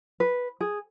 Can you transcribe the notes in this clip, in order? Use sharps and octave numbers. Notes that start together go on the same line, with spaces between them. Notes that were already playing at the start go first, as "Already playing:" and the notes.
B4
G#4